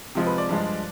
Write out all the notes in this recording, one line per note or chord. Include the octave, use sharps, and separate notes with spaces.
C3 F3 G#3
B4
D5
G2 F3 G#3